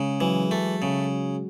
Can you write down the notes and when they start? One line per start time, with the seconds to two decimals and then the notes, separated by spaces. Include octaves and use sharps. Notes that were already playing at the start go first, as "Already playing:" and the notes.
Already playing: C#3 G#3 G#4
0.21 E3 F#3 F#4
0.51 A3
0.82 C#3